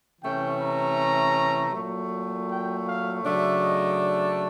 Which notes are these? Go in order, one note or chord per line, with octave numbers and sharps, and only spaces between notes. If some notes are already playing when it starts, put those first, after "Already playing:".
C3 E3 A3 C#4 G5
A#5
A#2 F#3 A3
G5
F5
C#3 F#3 A3 D4 E5
D#5
D5